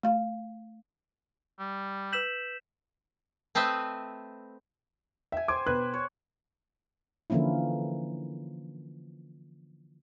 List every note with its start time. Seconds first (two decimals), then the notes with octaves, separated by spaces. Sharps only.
0.03 A3 F5
1.59 G3
2.13 B4 E6 G6 B6 E7 F#7
3.55 A3 C4 B4 D#5 E5
5.32 E5 G5 G#5
5.48 C5 G#5 D6
5.66 B2 B4 F#6
5.94 C#5
7.30 D3 E3 F3 A#3 C#4 E4